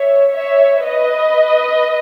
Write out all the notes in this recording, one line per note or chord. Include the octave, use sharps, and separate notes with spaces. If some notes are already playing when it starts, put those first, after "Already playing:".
Already playing: C#5 E5
C#5 E5
B4 D#5